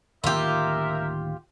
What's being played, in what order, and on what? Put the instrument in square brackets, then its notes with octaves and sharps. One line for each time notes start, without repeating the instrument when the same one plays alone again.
[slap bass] D1 D#3 A#3 [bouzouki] F4 G4 [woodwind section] A#4 E5